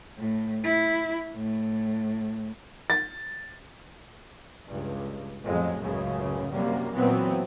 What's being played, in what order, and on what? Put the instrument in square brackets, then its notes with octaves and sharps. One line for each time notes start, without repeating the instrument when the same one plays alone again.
[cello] A2
E4
A2
[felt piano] A6
[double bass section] C#2 G2
A1 F2 F#3 G#3
C#2 F#2 A2 C#3
F#2 C3 G3 A#3
A#2 E3 F#3 B3 C4